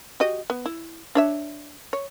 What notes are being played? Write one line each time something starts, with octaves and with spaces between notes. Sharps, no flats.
F#4 G4 D#5
B3
E4
D4 C#5 E5
C#5